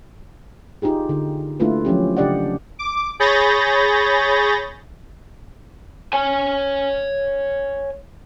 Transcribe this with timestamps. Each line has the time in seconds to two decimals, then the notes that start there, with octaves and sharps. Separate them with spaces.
0.82 D#4 F4 G4 G#4
1.09 D3
1.60 A3 A#3 D4 E4 F4 B4
1.85 F3 F#3 C#4 G4
2.16 C#3 D4 G4 D5 D#5 F#5
2.79 D6
3.20 G#4 C#5 B5 G6 A6 A#6
6.13 C#5 G#5